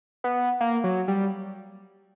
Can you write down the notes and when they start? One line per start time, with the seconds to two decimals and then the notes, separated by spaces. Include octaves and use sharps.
0.24 B3
0.61 A#3
0.84 F#3
1.08 G3